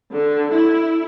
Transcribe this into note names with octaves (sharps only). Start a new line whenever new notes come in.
D3
E4